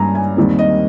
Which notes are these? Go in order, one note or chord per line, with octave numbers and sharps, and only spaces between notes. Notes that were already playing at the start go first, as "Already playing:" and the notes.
Already playing: G2 G3 A#3 C#4 G#5 A#5
G#5
D#2 D#3 G3 C4
D#5